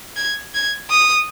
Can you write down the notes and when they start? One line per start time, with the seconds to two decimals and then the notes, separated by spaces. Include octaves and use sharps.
0.17 G#6
0.54 G#6
0.90 D#6